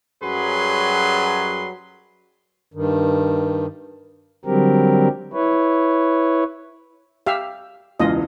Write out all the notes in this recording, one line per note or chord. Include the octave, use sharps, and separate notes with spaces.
F#2 F#3 G3 G#4 B4 C6
G2 D#3
D3 F#3 G3 C4 G4 A#4
E4 B4 C#5
G4 E5 F5
E1 C#2 E3 F4 D#5